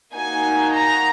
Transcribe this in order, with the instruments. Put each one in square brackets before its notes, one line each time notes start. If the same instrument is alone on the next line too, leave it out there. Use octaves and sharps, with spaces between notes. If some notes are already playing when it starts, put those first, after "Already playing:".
[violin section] A#3 D#4 F#4 G#5
A#5